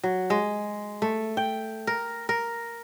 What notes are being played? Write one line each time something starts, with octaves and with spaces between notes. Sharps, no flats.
F#3
G#3
A3
G5
A#4
A#4